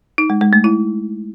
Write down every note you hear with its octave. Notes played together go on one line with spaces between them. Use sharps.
D#4
G#3
G#3
A3
E4